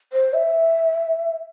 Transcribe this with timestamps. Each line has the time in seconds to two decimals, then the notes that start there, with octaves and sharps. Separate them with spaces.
0.13 C5
0.34 E5